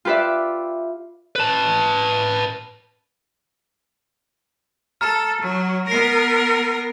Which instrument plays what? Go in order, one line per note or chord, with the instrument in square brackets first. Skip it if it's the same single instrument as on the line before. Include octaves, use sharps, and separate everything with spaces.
[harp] F4 G4 B4 D5 E5
[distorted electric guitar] B4 A5
[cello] A4 [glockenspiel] A#5 F6
[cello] F#3
[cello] B3 A#4 [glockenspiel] A#6 C7